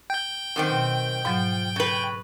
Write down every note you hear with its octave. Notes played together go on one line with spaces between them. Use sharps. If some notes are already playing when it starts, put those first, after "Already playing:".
G5 G6
F#2 D#3 C4
B2
G#2 F3 F#3
C#3 B4